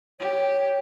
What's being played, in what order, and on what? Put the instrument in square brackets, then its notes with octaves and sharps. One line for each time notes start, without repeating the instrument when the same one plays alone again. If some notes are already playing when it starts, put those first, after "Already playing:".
[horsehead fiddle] G4 [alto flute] C#5